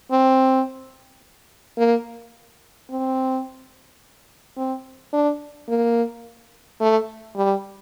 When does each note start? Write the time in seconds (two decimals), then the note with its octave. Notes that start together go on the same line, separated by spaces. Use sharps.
0.11 C4
1.78 A#3
2.90 C4
4.57 C4
5.13 D4
5.69 A#3
6.81 A3
7.36 G3